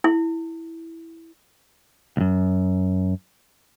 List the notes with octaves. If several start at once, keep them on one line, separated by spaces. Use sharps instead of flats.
E4
C#2 F#2